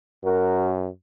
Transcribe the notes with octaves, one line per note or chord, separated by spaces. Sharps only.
F#2 F#4 A#4